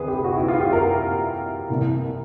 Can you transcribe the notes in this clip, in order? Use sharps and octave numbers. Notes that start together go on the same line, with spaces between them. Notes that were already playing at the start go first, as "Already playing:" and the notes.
Already playing: D2 C3 E3 G#4 B4
G4
F#4
E4
F4
G4
A#4
C2 C3 E3